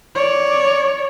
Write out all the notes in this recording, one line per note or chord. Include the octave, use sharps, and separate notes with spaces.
C#5 D5